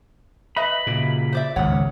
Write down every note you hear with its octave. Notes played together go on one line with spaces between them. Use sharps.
B4 D#5 E5 B5
A#2 C#3
C5 D5 E5
G#1 C#2 C#5 F#5